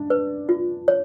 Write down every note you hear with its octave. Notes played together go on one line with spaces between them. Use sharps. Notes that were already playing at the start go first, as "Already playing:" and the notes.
Already playing: D4
B4
F4
C#5